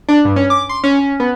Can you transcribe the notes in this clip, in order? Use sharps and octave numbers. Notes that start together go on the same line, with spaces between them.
D4
G2
C#4
D6
C6
C#4
C#4
B3